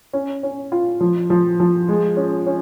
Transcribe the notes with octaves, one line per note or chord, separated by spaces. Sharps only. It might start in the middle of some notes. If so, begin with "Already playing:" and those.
C#4
C#4
F4
F3
F3
F3
G#3
C#4
C#4